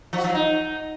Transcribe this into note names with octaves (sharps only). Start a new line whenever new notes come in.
F3
F#4
F3
F#3
D#4